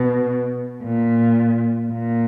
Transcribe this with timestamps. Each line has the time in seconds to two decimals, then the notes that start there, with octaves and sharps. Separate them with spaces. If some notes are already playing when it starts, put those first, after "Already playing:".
Already playing: B2
0.84 A#2
1.92 A#2